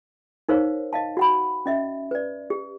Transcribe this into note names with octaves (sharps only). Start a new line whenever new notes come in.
D#4 A#4 C5 C#5 F5
D#5 F5 A5
F#4 F#5 B5
C#4 D#5 E5
B4 D5
G4